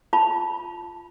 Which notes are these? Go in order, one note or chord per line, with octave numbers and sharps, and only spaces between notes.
F4 A5 B5